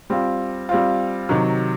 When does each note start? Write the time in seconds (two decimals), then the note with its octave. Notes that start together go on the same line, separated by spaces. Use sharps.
0.10 G3 C4 F4
0.69 G3 C4 F4
1.29 C3 D#3 F#3